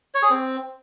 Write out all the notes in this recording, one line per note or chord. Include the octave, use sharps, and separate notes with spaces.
C#5
G#4
C4